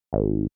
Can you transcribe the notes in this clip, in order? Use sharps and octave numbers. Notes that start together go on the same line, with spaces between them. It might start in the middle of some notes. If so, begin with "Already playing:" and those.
G#1